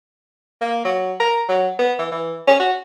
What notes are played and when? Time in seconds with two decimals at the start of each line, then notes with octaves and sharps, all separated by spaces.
0.61 A#3
0.85 F#3
1.20 A#4
1.49 F#3
1.79 B3
1.99 E3
2.12 E3
2.47 C#4
2.60 F#4